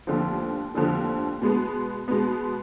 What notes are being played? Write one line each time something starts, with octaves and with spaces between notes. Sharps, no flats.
F1 D#2 D3 F3
F1 D#2 D3 F3
B2 G#3 B3
B2 G#3 B3